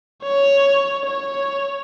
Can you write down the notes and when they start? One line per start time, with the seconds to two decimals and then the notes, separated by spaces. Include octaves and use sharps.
0.23 C#5
1.06 C#5